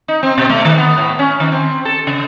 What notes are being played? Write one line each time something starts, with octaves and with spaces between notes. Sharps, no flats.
D#4
C4
B2
A3
D#3
B3
A2
C#4
D#3
C4
A4
C#3